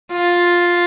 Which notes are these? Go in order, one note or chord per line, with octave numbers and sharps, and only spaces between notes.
F4